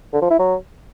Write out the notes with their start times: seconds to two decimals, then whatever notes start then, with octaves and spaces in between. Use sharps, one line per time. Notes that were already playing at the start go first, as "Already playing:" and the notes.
0.13 D3
0.22 F3
0.30 E4
0.39 F#3